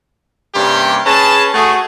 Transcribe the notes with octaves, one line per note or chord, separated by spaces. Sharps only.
G2 C3 G3 A#3 C#4 G4
C#4 G#4 B4 A5
A3 F#4 G#4